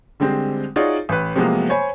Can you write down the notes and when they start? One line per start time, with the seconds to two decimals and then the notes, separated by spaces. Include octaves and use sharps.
0.20 D3 G3 G#3 C4 C5
0.76 D#4 F4 F#4 G#4 C#5 D5
1.09 A1 B4
1.35 C3 F3 F#3 G#3 A#3 B3
1.69 C5 C#5 G#5 B5